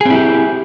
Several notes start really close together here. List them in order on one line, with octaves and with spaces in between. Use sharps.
G#4 C4 E4 G4